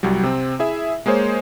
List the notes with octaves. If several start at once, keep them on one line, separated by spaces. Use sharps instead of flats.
C2 F#3 G3
C3 C4
E4 G#4 E5
G#3 A#3 G#4 C5 C#5